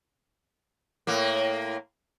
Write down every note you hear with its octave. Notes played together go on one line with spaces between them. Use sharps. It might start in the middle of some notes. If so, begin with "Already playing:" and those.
A2 A#3